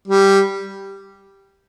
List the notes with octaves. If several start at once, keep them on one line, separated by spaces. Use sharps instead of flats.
G3